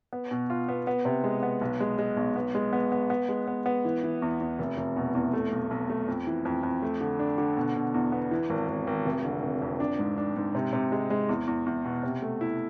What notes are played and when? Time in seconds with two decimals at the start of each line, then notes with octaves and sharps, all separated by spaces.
0.13 B3
0.31 B2
0.50 F4
0.68 B3
0.87 B3
1.05 C3
1.24 G#3
1.43 B3
1.61 B1
1.80 G#3
1.99 G#3
2.17 B1
2.36 B3
2.55 G#3
2.73 B3
2.92 B3
3.10 B3
3.29 G#3
3.47 B3
3.66 B3
3.85 E3
4.04 E3
4.22 E2
4.40 E2
4.59 F1
4.78 F1
4.96 B2
5.15 E2
5.33 A3
5.52 B1
5.71 B1
5.90 A3
6.08 F2
6.27 E3
6.45 F2
6.63 F2
6.82 A3
7.01 D3
7.19 D4
7.38 D3
7.57 B2
7.75 B2
7.94 E2
8.12 B3
8.31 E3
8.50 G#1
8.68 G#1
8.87 G#1
9.06 F1
9.24 D3
9.43 F1
9.62 F2
9.80 D4
9.99 G#2
10.18 D4
10.36 G#2
10.55 C3
10.73 C3
10.92 G#3
11.10 G#3
11.29 E2
11.47 E2
11.66 E2
11.85 B2
12.03 C3
12.22 A3
12.41 E4